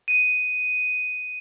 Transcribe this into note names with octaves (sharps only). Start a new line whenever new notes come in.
D#7